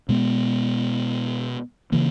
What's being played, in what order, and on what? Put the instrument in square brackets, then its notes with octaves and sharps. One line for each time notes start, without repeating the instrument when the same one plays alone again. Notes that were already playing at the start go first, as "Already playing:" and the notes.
[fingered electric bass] B2 G#3 B3
C#3 E3 A#3